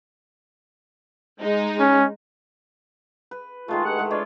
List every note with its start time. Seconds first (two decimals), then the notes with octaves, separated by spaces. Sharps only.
1.41 G#3 D#4
1.80 C#4
3.31 B4
3.68 D#3 G#3 A3 F4
3.85 G2 F#5
3.99 G#3 E4
4.10 D4 D#4 F4 B4 C#5 D5